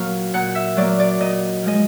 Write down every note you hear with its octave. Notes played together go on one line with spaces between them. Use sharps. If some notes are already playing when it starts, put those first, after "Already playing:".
Already playing: A#2 F#3 A#3 F5
A#2 F#5
E5
F#3 A#3 D5
D5
A#2 D#5
F3 G#3 D#5